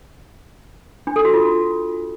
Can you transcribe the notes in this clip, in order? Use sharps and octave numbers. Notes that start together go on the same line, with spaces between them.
D4
A4
F#4
F4